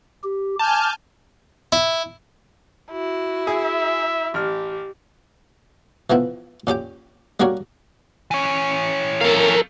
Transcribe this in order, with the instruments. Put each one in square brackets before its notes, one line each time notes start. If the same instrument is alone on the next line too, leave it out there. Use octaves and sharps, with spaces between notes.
[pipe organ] G4
[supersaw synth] G#5 F6 G6 [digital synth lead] A5 [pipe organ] D6
[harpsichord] E4
[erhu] E4 [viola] F#4
[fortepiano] G#4 [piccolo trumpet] E5
[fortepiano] A1 F6 [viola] G4
[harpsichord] E3 F3 B3 E4
A#2 C#4 G4 G5
G3 A#3 D4 F#4 A#4 C#5
[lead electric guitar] E3 C#5
[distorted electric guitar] A4 F5 [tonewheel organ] A#4